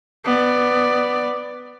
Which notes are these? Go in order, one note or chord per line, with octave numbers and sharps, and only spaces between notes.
B3 D5